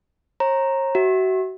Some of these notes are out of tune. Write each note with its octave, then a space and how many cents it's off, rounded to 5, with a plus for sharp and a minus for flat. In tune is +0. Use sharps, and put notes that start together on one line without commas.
C#5 -45 A#5 +0
F#4 +30 E5 -15